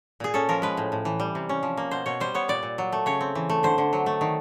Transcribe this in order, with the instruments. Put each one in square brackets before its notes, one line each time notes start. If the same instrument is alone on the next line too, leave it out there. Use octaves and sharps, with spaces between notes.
[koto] A#2 G#4
C#4 A4
F3 A#4
G#3 B4
A2
A2
E3
G3
C3
C#4
F3
A#3
B2 C5
B2 C#5
G3 C5
B3 C#5
A#2 D5
A#2
F#3
A3
C#3 C#5
C4
E3
A3
D3 C5
D3
F#3
A3
D#3